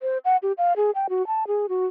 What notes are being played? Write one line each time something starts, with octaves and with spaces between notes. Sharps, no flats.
C5
F#5
G4
F5
G#4
G5
F#4
A5
G#4
F#4